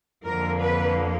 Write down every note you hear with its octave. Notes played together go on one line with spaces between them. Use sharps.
F2 D3 F3 A#3 A#4
B4